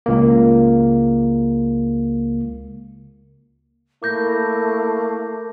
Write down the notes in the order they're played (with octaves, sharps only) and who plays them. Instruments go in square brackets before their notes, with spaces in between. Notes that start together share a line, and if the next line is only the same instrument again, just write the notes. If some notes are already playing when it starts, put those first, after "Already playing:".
[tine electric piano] C#2 A#3
[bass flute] A3 [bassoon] A#3 [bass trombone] E4 [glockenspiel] D6 G6 A#6